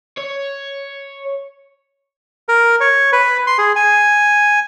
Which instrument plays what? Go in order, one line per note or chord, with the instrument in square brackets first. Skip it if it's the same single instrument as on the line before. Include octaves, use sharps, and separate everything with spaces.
[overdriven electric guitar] C#5
[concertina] A#4
C#5
B4
C6
G#4
G#5